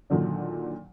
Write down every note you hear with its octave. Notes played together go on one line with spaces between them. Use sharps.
A#2 D3 D#3 F#3 D4